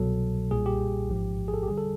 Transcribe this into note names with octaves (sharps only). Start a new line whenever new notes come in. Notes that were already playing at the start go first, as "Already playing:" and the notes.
Already playing: C2 B2 F#3 A4
B1 A#2 G3 G#4
G4
A1 G#2 F3
G#4
A4
G4
D3 G3 G#4
A4